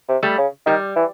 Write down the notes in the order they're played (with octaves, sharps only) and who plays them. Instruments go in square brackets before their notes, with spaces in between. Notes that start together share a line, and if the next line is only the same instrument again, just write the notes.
[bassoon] C3
[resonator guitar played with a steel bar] G3 A3
[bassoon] C#3
[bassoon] D#3 [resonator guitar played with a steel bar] G3
[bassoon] E3